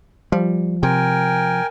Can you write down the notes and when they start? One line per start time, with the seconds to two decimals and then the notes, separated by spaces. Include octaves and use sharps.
0.32 F3 G3
0.83 C3 A#4 G5 G#5